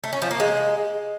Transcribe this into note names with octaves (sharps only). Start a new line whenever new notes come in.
A3
C#4
F3
A#3
G#3